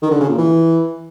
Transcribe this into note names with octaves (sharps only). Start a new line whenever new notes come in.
D#3
D3
C#3
A#2
E3